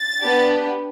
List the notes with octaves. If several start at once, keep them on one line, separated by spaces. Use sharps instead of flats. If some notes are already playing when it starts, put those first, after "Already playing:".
Already playing: A6
B3 D4 G4